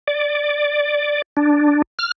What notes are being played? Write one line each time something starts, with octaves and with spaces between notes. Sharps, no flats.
D5
D4
F6